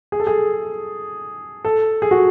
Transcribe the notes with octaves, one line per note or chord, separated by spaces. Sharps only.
G#4
A4
G#4
A4
G#4
F#4